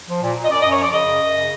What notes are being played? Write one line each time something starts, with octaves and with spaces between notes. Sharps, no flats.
F3
A#2
A#2
D#5
F#2 D5
D#5
F#2
C#5
F3 D5
C#3 D#5
F#2
F#2
C#3